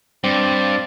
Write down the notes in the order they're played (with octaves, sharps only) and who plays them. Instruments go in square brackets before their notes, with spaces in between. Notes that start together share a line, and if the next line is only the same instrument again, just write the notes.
[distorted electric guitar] G2 [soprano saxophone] C4 [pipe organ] D5